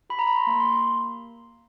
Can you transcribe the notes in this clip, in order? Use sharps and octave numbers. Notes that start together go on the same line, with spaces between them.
G4 B5
A#5
B5
C6
A#3
C6